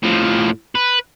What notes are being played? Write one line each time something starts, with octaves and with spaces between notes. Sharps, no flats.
A2 F3
B4